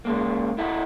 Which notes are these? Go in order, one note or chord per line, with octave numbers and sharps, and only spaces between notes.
C#3 G#3 A#3
E4 A4 D#5 E5 F#5 A#5